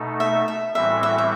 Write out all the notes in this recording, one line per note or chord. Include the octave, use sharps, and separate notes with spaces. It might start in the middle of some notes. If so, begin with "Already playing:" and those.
Already playing: B2 A3 D#4 A4
E5
E5
A2 E3 G3 C4 F#4 E5
E5
E5